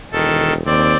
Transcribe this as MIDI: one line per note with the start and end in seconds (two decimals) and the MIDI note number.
0.12 0.61 28
0.12 0.53 51
0.12 0.53 69
0.66 0.95 39
0.66 0.97 60
0.66 0.97 74